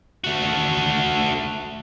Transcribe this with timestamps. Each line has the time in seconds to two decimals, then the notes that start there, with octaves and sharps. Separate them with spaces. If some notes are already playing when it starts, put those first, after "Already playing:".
0.24 A3 F#4